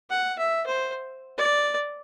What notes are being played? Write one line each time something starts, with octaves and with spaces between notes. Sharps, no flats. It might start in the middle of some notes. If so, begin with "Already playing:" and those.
F#5
E5
C5
D5